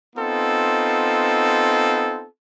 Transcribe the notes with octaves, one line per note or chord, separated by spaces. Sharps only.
B3 C4 D#4 F4 A4